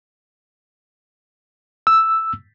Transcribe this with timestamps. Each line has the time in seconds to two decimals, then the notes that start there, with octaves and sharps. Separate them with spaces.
1.87 E6